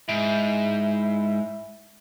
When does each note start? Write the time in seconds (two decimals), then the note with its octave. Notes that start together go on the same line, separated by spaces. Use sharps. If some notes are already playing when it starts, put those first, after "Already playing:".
0.09 G#2 E4